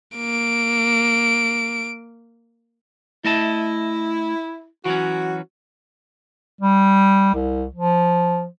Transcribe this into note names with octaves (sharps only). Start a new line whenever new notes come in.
A#3 D7
A3 E4 D#5 A5
E3 F#3 C#4 F#4
G3
C2
F3